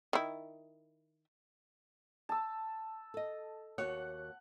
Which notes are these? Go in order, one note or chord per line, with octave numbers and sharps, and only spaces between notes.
D#3 E4
A5 E6
A4 D#5
D#2 F#4 C#5 F#5